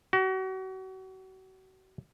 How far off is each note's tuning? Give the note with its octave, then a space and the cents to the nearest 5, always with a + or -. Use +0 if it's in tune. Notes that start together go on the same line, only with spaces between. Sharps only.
F#4 +35